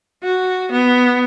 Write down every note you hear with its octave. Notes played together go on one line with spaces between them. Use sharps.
F#4
B3